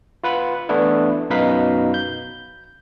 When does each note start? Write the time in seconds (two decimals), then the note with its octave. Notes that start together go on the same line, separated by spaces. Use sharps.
0.24 F4 B4 F#5 B5
0.69 E3 A3 B3 D4 E4
1.30 F#2 B2 D#4 B4 F5 B6
1.94 G6